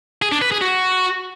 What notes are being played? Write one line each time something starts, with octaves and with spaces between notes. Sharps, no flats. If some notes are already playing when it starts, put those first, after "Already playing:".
G#4
D4
B4
G#4
F#4